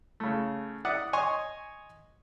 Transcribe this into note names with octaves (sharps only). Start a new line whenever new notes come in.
C#3 A3
D5 E5 F#5 D#6
C#5 D#5 G#5 C6 C#6 D#6